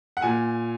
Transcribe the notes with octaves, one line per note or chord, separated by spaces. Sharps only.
F#5
A#2 G#5